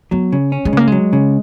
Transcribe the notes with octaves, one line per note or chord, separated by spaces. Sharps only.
F#3 B3
C#3
C#4
G#3
C#3 A#3
F#3 G#3
C#3